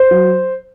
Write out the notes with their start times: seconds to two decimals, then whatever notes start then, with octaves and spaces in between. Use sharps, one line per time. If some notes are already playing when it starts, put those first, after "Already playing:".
Already playing: C5
0.11 F#3